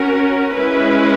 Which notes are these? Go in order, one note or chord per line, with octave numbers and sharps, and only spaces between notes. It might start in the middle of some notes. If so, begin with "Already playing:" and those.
Already playing: C#4 F#4 A#4
G#3 C#4 E4 B4